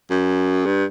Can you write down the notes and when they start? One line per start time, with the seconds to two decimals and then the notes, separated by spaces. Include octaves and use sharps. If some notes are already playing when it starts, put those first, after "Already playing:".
0.10 F#2
0.66 G2